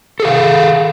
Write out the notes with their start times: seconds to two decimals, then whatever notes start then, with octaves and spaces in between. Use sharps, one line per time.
0.20 A4
0.22 G#4
0.25 F5